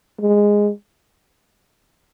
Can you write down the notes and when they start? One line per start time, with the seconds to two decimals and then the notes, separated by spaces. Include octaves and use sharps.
0.21 G#3